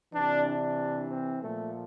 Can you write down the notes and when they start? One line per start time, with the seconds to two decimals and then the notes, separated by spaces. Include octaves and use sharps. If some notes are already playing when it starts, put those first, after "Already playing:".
0.13 C3 E3 D4
0.46 D4
1.10 C4
1.42 A#2 F3 A3